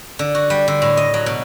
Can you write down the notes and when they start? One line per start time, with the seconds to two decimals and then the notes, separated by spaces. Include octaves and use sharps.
0.19 D3
0.35 F#4
0.50 G3
0.68 D3
0.82 A2
0.97 D#5
1.14 F#3
1.26 B2